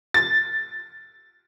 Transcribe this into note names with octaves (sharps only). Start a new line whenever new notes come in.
A6